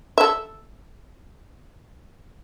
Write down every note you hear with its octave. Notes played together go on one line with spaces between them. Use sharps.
A4 E5